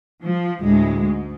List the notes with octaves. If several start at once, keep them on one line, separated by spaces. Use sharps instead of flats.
F3
D2 A2 G#3
G#2